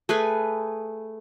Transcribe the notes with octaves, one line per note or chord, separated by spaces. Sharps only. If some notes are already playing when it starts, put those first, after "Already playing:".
A3 G#4 B4 G#5